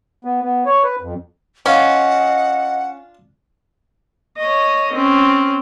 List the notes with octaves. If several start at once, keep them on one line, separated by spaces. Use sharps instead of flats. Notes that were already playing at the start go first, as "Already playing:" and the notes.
B3
B3
C#5
B4
F2
C#4 D4 F4 D#5 F#5
C#5 D#5
C4 C#4